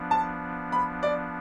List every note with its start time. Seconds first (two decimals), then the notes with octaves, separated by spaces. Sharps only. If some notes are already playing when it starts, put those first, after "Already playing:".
Already playing: F3 B3 D4
0.11 A5
0.72 B5
1.03 D5